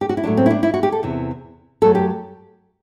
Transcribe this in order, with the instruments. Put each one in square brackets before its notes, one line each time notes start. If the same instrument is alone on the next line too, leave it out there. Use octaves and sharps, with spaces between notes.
[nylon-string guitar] G4
F#4
E4
A2 F#3 A3 D4
C4
E4
D4
E4
F#4
G4
A4
E2 C3 E3
F#2 F#3 A3 A4
G4